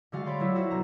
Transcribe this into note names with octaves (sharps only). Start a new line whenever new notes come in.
D3 G3 G#3 F#4 F5 A6
C#5 D5 B5 C6
F#3 G3 A3 E4
E4 F#4 A4 C5
B1 A#5